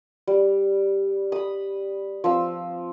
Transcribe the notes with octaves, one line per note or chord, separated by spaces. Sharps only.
G3
B5 D#6
F3 C4 E6